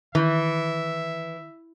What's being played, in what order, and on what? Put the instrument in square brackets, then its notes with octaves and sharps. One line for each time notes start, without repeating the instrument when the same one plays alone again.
[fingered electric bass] D#3 [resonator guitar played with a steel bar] E3 [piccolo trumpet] E5